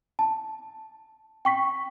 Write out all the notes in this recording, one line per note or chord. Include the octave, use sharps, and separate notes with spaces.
A5
G5 C#6 B6